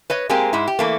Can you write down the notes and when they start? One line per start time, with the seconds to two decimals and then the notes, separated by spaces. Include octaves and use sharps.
0.10 B4 C#5 D#5
0.29 G#3 A#3 C4 G4 A#4 G#5
0.53 G#2 G#3 E4
0.67 G4
0.79 E3 A3 A#3